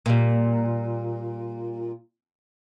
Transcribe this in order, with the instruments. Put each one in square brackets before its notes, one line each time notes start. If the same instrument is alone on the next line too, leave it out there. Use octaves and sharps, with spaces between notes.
[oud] A#2 G3